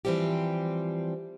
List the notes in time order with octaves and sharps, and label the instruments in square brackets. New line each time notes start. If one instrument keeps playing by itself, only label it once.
[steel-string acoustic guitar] E3 F3 G3 C4 G4